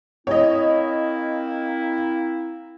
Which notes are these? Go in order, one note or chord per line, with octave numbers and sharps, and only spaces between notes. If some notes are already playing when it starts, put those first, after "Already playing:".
A#3 C4 E4 C#5 D#5